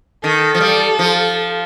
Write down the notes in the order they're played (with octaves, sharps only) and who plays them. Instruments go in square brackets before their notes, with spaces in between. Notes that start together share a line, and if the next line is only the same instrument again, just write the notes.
[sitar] D#3 [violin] A4
[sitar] F3
G3
F3